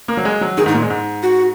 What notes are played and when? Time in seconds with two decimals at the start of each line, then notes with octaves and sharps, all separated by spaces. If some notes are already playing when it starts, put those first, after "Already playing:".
0.08 A#3
0.17 F#3
0.25 G#3
0.41 F#3
0.57 D#3 G#4
0.66 G#2 D#4
0.74 A#2
0.82 G#3
0.90 G#2
1.23 F#4